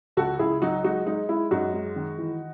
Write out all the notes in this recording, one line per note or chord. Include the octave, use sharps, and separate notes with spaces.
C#2 F#4 A4
C#2 E4 G#4
F#3 D#4 F#4
G#3 D#4 F#4
G#3 D#4
G#3 E4
F#2 D#4 F#4
G#3
D#3
E3